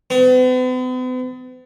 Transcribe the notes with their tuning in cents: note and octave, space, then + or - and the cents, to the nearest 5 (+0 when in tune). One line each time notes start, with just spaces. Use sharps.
B3 +45